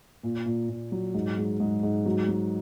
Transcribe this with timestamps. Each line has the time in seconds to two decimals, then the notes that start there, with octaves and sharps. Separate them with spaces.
0.23 A#2
0.46 A#2
0.69 A#2
0.92 F#3
1.14 G#2
1.38 G#3
1.60 G#2
1.83 G#2
2.06 F#3
2.28 F#3